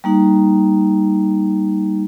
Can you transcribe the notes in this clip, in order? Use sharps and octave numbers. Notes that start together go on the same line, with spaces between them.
G3 A#3 D#4